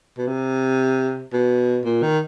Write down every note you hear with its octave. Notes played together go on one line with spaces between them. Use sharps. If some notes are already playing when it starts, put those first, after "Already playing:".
B2
C3
B2
A#2
D#3